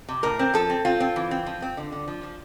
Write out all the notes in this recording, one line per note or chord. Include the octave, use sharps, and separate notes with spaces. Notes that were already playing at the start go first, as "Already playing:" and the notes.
C3
A2 A#4
C4
F3 A4
C4
C4 F4
C4
E3
C4
F3
C4
D3
D3
F3
F3